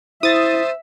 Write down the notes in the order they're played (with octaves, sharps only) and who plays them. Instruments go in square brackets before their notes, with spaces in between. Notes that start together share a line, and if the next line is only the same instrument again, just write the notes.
[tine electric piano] E4 [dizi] C5 [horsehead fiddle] E5 [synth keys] D#6 A6